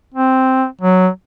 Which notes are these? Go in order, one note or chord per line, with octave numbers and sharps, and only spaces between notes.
C4
F#3